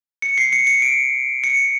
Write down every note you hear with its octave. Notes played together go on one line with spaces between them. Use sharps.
C#7
C7
C#7
C#7
D7
C#7